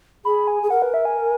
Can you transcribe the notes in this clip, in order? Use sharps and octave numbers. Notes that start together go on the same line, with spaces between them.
G#4 B5
G#5
G#4
A#4 F#5
B4
E5
G#5